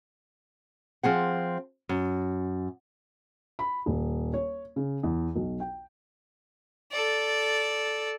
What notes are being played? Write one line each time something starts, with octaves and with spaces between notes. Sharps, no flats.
F3 C4 G#4 F#5
F#2
B5
D#1
C#5
C#3
E2
B1
G5
A4 D5